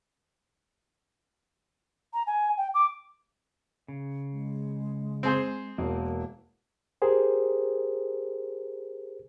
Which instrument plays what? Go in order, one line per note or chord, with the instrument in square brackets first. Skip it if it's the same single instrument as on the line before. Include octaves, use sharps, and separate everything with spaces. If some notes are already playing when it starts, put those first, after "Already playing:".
[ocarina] A#5
G#5
G5
D6
[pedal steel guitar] C#3
[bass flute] G#3
[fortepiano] C4 G#4 C5
[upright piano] E1 [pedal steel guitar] E3 A#3
[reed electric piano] G4 G#4 A#4 C5